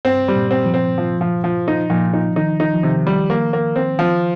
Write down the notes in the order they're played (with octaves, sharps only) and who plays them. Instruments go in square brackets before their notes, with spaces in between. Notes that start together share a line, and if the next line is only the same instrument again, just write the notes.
[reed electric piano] G2 [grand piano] C4
[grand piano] G3
[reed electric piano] A#2
[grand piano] C4
[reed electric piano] F3
[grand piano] C4
F3
F3
F3
D#4
[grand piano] A#2 [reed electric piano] F3
[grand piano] D#4
[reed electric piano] D#3 [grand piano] D#4
[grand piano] D#4
[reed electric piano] F3
[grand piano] C3 [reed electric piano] D#3
[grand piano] G3
A#3
A#3
C4
F3